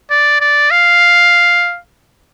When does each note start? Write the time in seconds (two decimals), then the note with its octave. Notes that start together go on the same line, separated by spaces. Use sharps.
0.10 D5
0.40 D5
0.71 F5